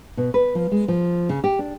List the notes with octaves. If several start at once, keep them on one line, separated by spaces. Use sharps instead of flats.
B2
B4
F3
G#3
F3
C#3
G4
D4